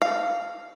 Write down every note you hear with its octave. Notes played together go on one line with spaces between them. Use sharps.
F5